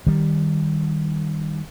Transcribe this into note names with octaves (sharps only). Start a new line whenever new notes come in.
D#3 G3